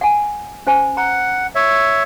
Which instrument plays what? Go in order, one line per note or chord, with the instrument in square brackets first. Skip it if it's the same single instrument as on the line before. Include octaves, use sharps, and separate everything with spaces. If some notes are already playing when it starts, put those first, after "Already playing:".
[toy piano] F#5 G#5
C#4 C5 G#5
[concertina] F#5 [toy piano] A#5
[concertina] C#5 E5